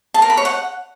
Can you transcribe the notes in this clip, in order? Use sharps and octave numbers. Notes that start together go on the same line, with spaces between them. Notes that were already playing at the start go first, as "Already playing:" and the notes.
A5
A#4
B5
C#5
F#5